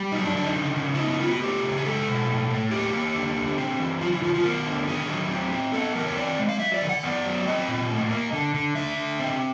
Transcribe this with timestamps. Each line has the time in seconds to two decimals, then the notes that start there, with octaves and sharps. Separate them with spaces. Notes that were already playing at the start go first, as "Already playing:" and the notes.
Already playing: G3
0.12 F#3 D#4
0.24 D4
0.34 D3 D4
0.44 D#4
0.56 C#3
0.77 C#3
0.94 E4
0.98 B3 D#4
1.10 D#4
1.20 B3 F4
1.32 F#4
1.42 A3 G4
1.63 C#3
1.77 G#4
1.85 G#3 A4
2.07 B2
2.28 A2
2.50 A2
2.71 A#3 G4
2.93 A#3
3.15 D3
3.36 D3
3.58 C4
3.80 E3
4.01 F#3 F4
4.12 E4
4.22 D#3 F4
4.34 F4
4.44 B3 A#4
4.66 D3
4.87 D#3 G#4
5.09 F#3
5.31 C4
5.52 C4
5.73 B3 A4
5.95 E3 A#4
6.06 C#5
6.17 C4 D5
6.38 G#3
6.49 F5
6.60 F#3 E5
6.74 D5
6.82 D#3
6.89 F#5
7.03 B3 D5
7.24 F#3
7.47 C4 D#5
7.68 A#2
7.90 A2
8.11 A#3
8.33 D3
8.54 D3
8.75 D3 E5
8.97 D3
9.20 C4